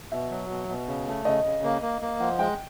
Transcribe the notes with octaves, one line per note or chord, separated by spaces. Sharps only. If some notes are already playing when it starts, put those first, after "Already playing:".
B2 E5
F#3
B2
B2
C#3
A3
C#3 D#5
C#3
A#3
A#3
A#3
F3 F#5
G#3 G5